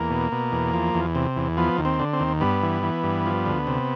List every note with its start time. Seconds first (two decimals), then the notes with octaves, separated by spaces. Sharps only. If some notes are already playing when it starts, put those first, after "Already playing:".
Already playing: E2 A#3
0.10 B2
0.32 B2
0.52 E2
0.74 F3
0.94 E2
1.15 C3
1.36 E2
1.57 F3 B3
1.78 D#2
1.85 C4
1.99 D3
2.13 C4
2.20 D#2
2.41 G2 B3
2.63 E3
2.83 E3
3.03 G2
3.26 F3
3.46 D2
3.67 C3